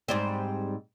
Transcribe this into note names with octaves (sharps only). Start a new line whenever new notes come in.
G#2 G3 C4